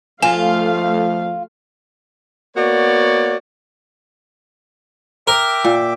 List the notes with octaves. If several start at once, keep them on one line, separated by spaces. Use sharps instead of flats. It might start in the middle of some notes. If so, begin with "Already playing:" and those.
F3 A3 F4 F5 G#5
A#3 B3 F#4 C#5 D5
A#4 E5 G5 D6
A#2